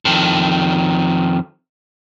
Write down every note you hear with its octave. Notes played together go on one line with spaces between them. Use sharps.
F2 D#3